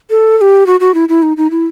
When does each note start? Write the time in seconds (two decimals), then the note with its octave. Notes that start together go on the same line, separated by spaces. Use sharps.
0.10 A4
0.38 A4
0.41 G4
0.67 F#4
0.80 F#4
0.94 E4
1.09 E4
1.23 D#4
1.37 D#4
1.51 E4